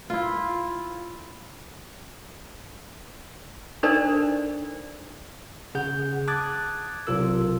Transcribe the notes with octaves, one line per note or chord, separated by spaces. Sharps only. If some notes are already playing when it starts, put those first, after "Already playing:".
E4 F4
D4 D#4 A4 A#4 C5 D5
C#3 G#4 F#5 G6
A5 D6 D#6 F#6 G#6 A6
B1 C3 F4 A#4 E6